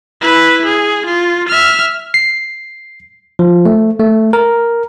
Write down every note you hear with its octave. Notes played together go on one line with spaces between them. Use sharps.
E4 B4
G#4
F4
E5 F6
C7
F3
A3
A3
A#4